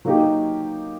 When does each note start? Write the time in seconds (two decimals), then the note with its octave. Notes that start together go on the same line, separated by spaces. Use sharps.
0.05 F#3 A#3 D#4 G4